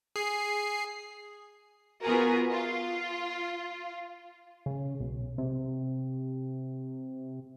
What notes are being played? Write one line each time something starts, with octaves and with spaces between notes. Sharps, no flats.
G#4 C7
B3 F4 F#4 G#4 A#4
F4
C#3
B1
C3